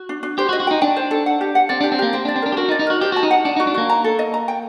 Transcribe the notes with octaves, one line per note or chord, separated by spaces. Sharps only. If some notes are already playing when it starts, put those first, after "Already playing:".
Already playing: F#4
D4
D4
G4 C5
F#4
D#5
F#4
D#4 G5
D4 G5
C5
A4
F#5
G4
F#5
C4 D5
D4 G4
C4
A#3 G4
C4 G5
D4 D5
C4
D4 A#4
G4
F#4 A#4
D#4
D5
D#4
F#4 A#4
G4 C5
F#4 A5
D#4
F#5
D4 F#5
D#4 F#4
D4
A#3 F#4
A#5
A4
D#5
A#5
G5